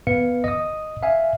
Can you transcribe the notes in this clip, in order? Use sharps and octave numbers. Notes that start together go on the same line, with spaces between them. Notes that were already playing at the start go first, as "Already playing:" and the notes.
B3 B4 F5 C#7
D#5 D#6
E5 F5 G#5